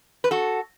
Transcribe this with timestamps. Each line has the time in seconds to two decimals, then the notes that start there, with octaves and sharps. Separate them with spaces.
0.24 B4
0.31 F#4 A4